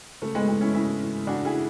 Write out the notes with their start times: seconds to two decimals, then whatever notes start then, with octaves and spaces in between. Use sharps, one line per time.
0.22 C#3 A3
0.35 G#3 B3
0.41 A3
0.48 E3 G#3
0.61 C#4 E4
0.74 C#3 C#4 E4
1.00 E3
1.27 C#3 D4 F#4
1.45 E4 G#4
1.53 E3